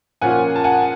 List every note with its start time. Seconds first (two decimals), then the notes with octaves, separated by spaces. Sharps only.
0.22 A#2 F3 A#3 C#4 F4 F#5 G#5
0.56 A5
0.64 F#5 G#5